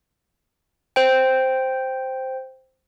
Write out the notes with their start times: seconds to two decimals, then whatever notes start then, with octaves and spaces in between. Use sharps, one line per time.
0.96 C5 G5